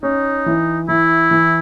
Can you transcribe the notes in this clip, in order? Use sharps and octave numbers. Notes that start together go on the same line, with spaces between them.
C#4 D#4
E3
E3 E4
E3